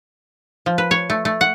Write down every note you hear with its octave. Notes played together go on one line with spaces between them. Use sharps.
F3
B4
C#5
A3
A3
F#5